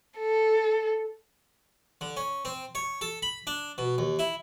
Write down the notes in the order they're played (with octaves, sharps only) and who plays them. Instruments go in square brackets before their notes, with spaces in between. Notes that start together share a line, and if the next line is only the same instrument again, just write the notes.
[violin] A4
[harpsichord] D3
C#4
C4
C#5
A4
B5
D4
B2
D#2
E4